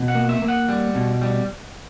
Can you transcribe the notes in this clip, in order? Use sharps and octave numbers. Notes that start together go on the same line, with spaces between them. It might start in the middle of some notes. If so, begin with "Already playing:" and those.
Already playing: B2
F#5
A#3
E5
A#3
F#5
G3
B2
G3